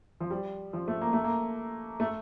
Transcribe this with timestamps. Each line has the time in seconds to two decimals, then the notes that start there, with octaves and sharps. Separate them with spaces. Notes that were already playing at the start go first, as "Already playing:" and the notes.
0.21 F3
0.30 G3
0.73 F3
0.88 A3
1.01 A#3
1.13 A3
1.24 A#3
2.00 A3